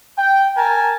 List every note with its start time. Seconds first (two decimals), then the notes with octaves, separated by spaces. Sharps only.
0.18 G5
0.56 A#4 G#5 A5